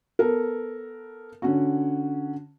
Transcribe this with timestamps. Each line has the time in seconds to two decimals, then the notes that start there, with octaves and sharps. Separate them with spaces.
0.19 B3 A4 A#4
1.42 D3 C#4 F#4